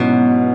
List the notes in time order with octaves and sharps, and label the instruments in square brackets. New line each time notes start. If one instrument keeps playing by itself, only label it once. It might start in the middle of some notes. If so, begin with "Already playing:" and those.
Already playing: [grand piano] G#2 F#3 C#4 E4 [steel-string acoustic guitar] B2